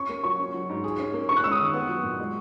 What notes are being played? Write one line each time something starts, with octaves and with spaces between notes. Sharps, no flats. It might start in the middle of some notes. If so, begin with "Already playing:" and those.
Already playing: C#4 C#6
A#3
F#3 C#6
C#4
F#3
G#2
G#4
C#4
A#3
C#4 C#6
F#6
G#3 E6
D#6
D#3
B3
F#3
A#2
G#3